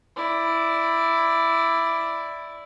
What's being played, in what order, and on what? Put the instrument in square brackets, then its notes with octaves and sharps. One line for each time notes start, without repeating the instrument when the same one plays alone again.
[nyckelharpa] E4 D5